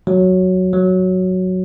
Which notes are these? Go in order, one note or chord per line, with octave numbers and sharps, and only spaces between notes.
F#3
F#3